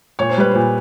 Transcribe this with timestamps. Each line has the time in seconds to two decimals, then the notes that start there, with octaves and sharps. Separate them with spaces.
0.19 A#2 C#5
0.29 C5
0.38 G3 B4
0.51 A#2 C5